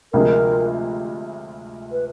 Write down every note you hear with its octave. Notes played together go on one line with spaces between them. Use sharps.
D2 C3 F3 G#3 A#4
B4